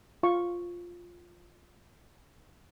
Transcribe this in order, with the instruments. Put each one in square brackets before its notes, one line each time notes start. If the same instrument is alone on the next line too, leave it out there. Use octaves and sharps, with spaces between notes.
[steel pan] F4 F5 C#6